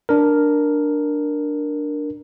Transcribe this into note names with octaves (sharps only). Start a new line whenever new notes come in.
D4 A#4